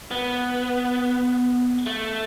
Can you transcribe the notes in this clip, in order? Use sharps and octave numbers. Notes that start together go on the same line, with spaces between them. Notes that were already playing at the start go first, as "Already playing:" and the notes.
B3
A3